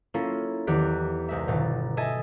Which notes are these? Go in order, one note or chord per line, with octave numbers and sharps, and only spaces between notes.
A#3 C#4 E4 F4 A4
E2 D#3 G4 F#6 B6 D7
C2 G#3 E5
G1 B2 D#3 A6
A4 D#5 E5 G#5 A5